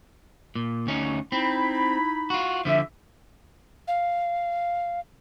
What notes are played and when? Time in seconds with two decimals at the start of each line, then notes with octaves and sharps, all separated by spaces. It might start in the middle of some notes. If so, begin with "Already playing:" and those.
0.55 A#2
0.87 D2 C#4 D#4
1.32 C4 D#4 E4 B5
2.30 F4 F#4
2.65 D3 F3 E5
3.88 F5